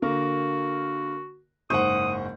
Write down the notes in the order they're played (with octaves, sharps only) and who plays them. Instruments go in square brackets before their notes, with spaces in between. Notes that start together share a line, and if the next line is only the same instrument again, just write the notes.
[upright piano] D3 A#3 A#4 [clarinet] F#4
[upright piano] F#1 G#2 C#6 [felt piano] C5 F#5 [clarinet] D#6